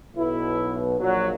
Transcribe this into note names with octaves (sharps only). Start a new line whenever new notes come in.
B1 B2 E4
A#1 A#2 F#3